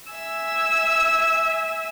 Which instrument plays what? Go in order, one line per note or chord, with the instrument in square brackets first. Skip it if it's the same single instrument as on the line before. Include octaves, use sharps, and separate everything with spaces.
[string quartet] E5 G#5 E6